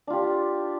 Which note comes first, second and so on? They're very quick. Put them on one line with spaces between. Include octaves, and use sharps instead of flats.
D4 F4 G4